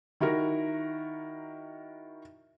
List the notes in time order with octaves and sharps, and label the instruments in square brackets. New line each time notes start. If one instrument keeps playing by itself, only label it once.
[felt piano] D#3 E4 F#4 A#4